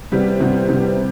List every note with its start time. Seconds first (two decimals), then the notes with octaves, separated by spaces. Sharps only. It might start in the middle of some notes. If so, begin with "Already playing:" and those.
0.12 C3 G3 B3
0.40 C3 G3 B3
0.69 C3 G3 B3